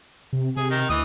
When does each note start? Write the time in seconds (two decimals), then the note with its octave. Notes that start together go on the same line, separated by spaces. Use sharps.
0.33 C3
0.57 C3 G#4
0.71 D#3 D#4
0.90 D2 E3 D#5 D#6